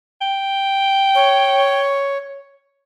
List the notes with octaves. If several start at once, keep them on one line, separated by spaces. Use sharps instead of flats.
G5
C#5